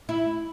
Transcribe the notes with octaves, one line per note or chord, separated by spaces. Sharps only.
E4